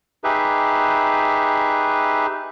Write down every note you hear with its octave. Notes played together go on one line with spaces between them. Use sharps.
D#4 G4 G#4 B4 E5